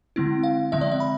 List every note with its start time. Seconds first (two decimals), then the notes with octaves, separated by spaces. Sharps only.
0.16 D3 G#3 C4 E4
0.43 F5
0.72 D3 F3 G#3 C4 E5
0.81 D5
0.91 E5
1.00 B5